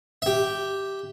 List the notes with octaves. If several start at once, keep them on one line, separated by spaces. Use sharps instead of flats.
G4 E5